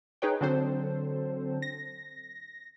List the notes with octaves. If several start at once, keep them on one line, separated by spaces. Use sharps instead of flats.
D#4 G#4 B4 C#5 G5
D3 F#3 C4 A4 C5
A#6